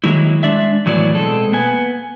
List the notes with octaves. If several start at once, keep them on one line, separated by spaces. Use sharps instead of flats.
D#3 F#3 G#3 A#3 E4
G#3 D4 D5 E5
A2 E3 F#3 B3 E4 D5
B2 G#3 C4 A4
A#3 B3 G#5